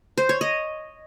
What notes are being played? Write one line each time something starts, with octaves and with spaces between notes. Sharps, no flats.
C5
C#5
D#5